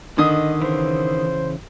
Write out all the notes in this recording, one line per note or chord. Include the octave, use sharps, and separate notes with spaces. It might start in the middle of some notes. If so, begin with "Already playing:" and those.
D3 D#3 D#5 D#6
C#3 E3 C5